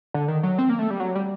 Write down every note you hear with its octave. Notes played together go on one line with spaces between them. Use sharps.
D3
D#3
F#3
C4
A#3
A3
G3
F#3
G3